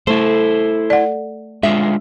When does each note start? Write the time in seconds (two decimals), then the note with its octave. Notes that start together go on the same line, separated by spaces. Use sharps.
0.07 A3 E4 C5
0.90 D5 F#5
1.63 G#3 D4 F4 E5